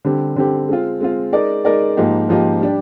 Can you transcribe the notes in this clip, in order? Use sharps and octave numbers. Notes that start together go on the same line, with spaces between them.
D3 G3 C4 G4
D3 G3 C4 G4
G#3 C4 F4
G#3 C4 F4
G#3 D#4 A#4 D5
G#3 D#4 A#4 D5
G#2 F3 A#3 D#4 G4
G#2 F3 A#3 D#4 G4
G3 D4 G4